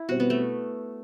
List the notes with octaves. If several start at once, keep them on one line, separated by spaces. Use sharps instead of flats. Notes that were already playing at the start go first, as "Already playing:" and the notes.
Already playing: E4
B2 G3 C4 F#4
B3
A3